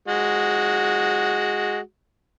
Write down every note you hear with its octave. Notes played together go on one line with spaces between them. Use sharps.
G#3 F#4